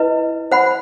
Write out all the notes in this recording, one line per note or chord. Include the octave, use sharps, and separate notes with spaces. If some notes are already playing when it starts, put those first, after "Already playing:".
Already playing: E4 B4 D#5
C5 F#5 B5